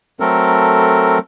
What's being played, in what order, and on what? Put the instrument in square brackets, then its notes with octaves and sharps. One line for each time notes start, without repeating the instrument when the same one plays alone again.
[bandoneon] F#3 A3 C4 A4 A#4